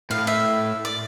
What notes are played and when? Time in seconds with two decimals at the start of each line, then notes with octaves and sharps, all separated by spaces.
0.10 A2 F5
0.27 E5
0.85 D5